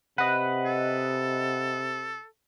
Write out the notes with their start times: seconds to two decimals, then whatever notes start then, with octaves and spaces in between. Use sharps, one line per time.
0.18 C3 B4 D#5 F#5
0.65 A4